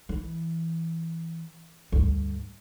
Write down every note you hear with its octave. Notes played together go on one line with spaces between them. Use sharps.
E3
D2 G2